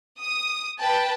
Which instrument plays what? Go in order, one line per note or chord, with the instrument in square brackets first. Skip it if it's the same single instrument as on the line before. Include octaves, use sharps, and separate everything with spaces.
[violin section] D#6
B4 G5 A5